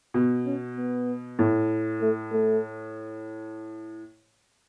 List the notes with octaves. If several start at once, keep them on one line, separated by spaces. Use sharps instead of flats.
B2
C#4
B3
A2
A3
A3